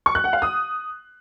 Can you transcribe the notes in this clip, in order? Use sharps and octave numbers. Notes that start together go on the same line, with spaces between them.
C#6
F#6
F#5
F5
D#6